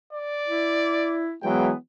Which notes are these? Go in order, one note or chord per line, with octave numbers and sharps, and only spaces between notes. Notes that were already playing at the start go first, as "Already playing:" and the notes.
D5
E4
E3 F#3 G#3 B3 G5